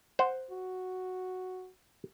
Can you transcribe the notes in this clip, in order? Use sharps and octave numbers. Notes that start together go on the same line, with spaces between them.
C5 F#5
F#4